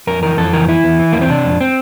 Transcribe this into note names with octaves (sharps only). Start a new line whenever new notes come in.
F2 A#4
E3 A#4
F2 A4
E3 A#4
E3 E4
E2
E3
E2 A#3
C4
C3 D4
F2
C4